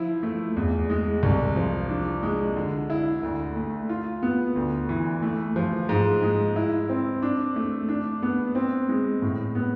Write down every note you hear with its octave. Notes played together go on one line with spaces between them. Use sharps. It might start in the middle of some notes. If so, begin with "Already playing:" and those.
Already playing: F3 E4
A3
E2
G#3
C2
F3
D4
G#3
D3
E4
D2
A3
F4
B3
D2
E3
A3
F3
G#2
G#3
E4
C4
D4
A3
D4
B3
C4
G#3
A2
B3